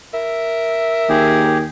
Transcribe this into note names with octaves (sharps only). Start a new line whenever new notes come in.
A#4 E5
D#2 G4 G#4